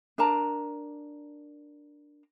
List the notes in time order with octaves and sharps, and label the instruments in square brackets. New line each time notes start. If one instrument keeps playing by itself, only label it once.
[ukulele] D4 A#4 A5 A#5